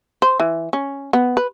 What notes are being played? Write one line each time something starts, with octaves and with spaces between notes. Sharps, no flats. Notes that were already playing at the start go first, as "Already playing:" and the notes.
C5
E3
C#4
B3
B4